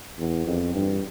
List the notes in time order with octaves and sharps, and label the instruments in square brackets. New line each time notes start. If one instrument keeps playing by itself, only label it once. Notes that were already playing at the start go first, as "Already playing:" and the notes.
[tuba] E2
F2
G2